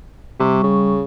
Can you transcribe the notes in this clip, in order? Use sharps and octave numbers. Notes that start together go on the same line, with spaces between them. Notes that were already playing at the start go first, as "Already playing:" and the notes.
C3 G3 C#6
C#3